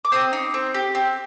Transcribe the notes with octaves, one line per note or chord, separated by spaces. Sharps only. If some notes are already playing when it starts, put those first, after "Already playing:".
D6
C4 C6 D#6
D#4
C4
G4
C4